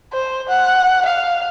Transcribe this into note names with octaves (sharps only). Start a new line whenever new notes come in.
C5
F#5
F5